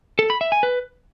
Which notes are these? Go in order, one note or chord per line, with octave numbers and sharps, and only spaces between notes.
A4
B5
E5
G#5
B4